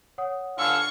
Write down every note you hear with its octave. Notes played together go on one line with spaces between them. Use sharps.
C#5 F#5 D#6
D3 F5 G#5 C#6 E6